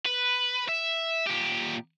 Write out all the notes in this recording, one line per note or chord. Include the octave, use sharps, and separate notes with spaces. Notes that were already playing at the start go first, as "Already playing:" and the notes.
B4
E5
A#2 G4